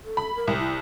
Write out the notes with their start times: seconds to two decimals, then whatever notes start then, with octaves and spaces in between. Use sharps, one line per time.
0.04 A4
0.17 B5
0.36 A#4
0.47 C2
0.59 E4